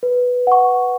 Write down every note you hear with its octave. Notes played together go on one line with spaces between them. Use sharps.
B4
F#5 C#6